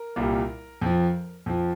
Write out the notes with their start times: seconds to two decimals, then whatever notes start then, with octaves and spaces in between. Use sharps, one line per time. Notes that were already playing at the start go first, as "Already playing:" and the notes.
Already playing: A#4
0.16 C2 A#2 G3
0.81 F2 F3
1.46 F2 F3